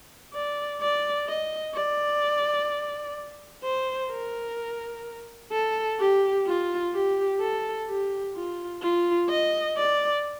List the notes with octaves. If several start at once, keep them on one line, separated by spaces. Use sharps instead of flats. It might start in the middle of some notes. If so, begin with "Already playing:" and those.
D5
D5
D#5
D5
C5
A#4
A4
G4
F4
G4
A4
G4
F4
F4
D#5
D5